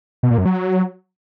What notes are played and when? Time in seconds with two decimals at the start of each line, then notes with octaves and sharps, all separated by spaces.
0.23 B2
0.31 A#2
0.38 F#2
0.45 F#3